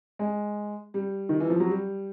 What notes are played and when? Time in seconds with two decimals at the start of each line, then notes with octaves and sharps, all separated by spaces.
0.19 G#3
0.94 G3
1.29 D#3
1.40 E3
1.50 F3
1.60 F#3
1.70 G3